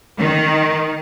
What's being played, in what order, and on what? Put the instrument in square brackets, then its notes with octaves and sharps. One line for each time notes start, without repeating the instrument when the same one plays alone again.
[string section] D#3